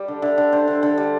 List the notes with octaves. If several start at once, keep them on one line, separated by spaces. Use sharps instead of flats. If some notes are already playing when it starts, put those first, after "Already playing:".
Already playing: G3
D3
D3 E5
D3
D3 C5
D3
D3 A4
G3